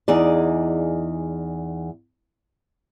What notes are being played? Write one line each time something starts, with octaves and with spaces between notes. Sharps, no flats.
E2 D#4 G#4 D5